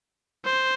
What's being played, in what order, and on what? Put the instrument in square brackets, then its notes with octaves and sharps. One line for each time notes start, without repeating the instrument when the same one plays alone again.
[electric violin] C5